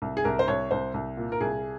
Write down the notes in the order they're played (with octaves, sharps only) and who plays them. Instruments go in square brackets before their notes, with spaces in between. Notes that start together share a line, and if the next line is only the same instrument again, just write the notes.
[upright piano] C2
G#4
C2 A#4
C5
C2 C#5
C2 C5
C2
A#2
A#4
C2 G#4